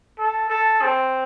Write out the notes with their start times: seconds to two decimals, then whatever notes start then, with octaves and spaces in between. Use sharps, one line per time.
0.19 A4
0.50 A4
0.82 C4